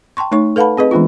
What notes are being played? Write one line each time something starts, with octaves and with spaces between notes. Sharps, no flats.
G5 A5 C6 C#6
A3 D#4 C#5 C#6
A4 B4 F5 F#5 A5 B5
C4 G#4 B4 D#5
E3 G#3 B3 D4 F4